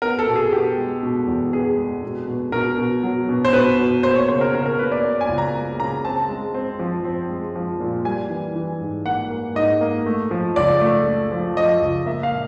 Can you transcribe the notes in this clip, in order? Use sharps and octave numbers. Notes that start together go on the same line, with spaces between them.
B3 A#4
A4
B2
G#4
B3 G4
G#3
B2
E2
B3 G#4
G#3
B2
B2
B2 A#4
B2
F#3
B2
C5
B2 B4
B2
A#3 C5
C#5
C#3 C5
A#4
C#3 A#4
A#4
A#3 B4
D5
A#3
G#5
C#2
A#5
A#3
C#3 A#5
C4 A5
G#3
C4
F3
C4
G#3
F3
A#2
G3 G#5
E3
E3
G#2
A#3 F#5
A#3
G#2 D#5
A#3
A3
F3
C#2 D5
A3
A3
F3
F3 D#5
C#2
A#3 E5
F5
A#2